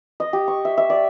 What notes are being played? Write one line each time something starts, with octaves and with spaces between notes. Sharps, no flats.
D#5
G4
C#6
E5
E5
D5